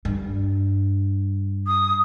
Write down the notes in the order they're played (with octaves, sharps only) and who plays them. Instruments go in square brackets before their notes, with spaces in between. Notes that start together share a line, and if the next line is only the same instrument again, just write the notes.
[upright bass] G2
[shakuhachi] D#6